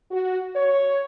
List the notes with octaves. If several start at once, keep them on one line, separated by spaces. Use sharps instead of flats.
F#4
C#5